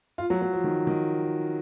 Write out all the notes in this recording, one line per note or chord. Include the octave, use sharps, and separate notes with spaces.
F4
F#3
F#3
F3
D#3
D#3